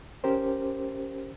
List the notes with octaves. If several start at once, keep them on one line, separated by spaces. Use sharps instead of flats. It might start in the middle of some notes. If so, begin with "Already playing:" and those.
C#4 G4 A#4 C5